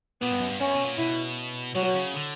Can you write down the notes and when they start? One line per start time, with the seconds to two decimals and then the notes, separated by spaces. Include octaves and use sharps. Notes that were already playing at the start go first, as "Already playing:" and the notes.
0.21 A#2 B3
0.31 G2
0.41 F#2
0.50 G2
0.60 F#2 C#4
0.75 B2
0.85 A#2
0.98 B2 E4
1.75 B2 F#3
1.95 C#3
2.14 D3